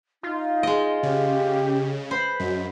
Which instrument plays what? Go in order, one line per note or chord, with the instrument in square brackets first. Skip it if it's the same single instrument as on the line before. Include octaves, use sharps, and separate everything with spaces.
[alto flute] D#4 [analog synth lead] F4
[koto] G#3 D#5
[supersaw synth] C#3 [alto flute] G4
[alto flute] B4 [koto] C5 [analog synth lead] B5
[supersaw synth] F#2 [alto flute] D#5